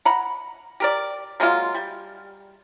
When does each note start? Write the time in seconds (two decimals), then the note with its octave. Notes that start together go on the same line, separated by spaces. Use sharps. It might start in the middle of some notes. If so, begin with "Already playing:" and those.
0.05 F#5 A#5 B5
0.80 G4 A#4 D5
1.40 F#3 G#3 A#3 F4
1.74 G3